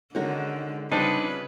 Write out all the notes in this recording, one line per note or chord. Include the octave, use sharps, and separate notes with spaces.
D3 D#3 G#3 C#4 F#4 A#4
C#3 F3 G3 C4 D4 D#4 B4 G5